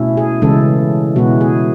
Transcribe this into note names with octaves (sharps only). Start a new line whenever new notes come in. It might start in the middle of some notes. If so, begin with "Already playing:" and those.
Already playing: B2 A3 C#4 E4
G#4
C#3 E3 G#3 C#4 E4 A4
B2 G#3 B3 E4 F#4
G#4